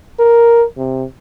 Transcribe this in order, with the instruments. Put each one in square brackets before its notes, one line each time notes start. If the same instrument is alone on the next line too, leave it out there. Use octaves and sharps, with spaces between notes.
[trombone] A#4
C3